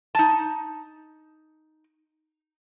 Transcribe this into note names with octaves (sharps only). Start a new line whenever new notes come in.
D#4 A5